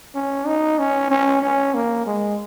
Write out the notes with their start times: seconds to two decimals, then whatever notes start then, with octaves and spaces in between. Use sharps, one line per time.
0.15 C#4
0.47 D#4
0.79 C#4
1.11 C#4
1.43 C#4
1.74 A#3
2.07 G#3